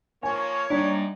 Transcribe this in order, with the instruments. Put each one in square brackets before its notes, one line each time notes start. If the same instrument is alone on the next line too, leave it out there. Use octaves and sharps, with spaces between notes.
[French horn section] F3 A#3 [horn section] C#5 [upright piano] G#5
[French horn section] F#2 D#4 D5 [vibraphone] G3 A#3 [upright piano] D4